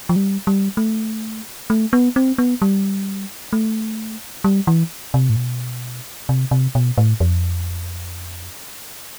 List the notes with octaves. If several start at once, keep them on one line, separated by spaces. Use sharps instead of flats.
F3
G3
G3
A3
A3
B3
C4
B3
G3
A3
G3
E3
C3
A2
B2
C3
C3
B2
A2
F2